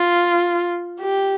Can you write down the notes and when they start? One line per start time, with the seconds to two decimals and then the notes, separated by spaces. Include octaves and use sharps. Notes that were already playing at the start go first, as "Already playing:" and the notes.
Already playing: F4
1.01 G4